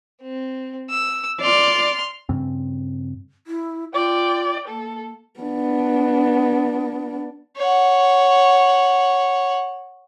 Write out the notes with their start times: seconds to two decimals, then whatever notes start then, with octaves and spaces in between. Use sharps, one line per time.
0.22 C4
0.90 E6
1.41 D5 C6 F6
2.29 G2 C#3 C4
3.47 E4
3.94 F4 D5 G5
4.68 A#3 A4
5.40 B3 D4
7.57 C#5 F#5